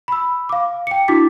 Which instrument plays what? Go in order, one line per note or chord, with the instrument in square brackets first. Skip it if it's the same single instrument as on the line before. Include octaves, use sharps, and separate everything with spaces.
[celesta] B5 E6
F5 D6
G5 C#7
D4 E4 F#4 D6 B6